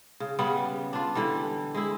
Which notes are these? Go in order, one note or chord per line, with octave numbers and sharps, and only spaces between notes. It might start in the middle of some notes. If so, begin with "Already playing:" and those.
C#3
C#3 G3 B3
D4 F4
D3 E3 G3
G#3 E4